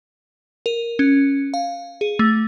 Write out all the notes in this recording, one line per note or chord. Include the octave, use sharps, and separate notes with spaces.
A#4
C#4
F5
G#4
A3